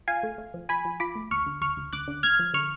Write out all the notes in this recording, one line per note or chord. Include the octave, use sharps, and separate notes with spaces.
F4 F5 G#5
A3
A3
F3
F3 G#5 B5
F3
F4 B5 D6
A3
D2 C#6 F6
D3
D2 C#6 F6
D2
D2 D6 F#6
D3
D2 F6 G#6
F3
D3 C#6 F6